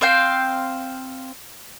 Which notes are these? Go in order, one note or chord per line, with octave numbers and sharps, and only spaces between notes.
C4 C5 F5 G5